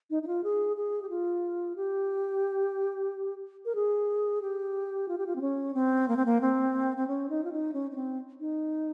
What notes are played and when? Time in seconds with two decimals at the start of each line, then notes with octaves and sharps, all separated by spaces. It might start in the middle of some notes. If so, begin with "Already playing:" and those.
0.10 D#4
0.23 D#4
0.27 F4
0.43 G#4
0.77 G#4
1.02 G4
1.09 F4
1.76 G4
3.65 A#4
3.75 G#4
4.42 G4
5.08 F4
5.18 G4
5.27 F4
5.36 C4
5.41 C#4
5.74 C4
6.08 A#3
6.17 C4
6.25 A#3
6.41 C4
6.97 C4
7.07 C#4
7.29 D#4
7.44 F4
7.52 D#4
7.73 C#4
7.91 C#4
7.95 C4
8.40 D#4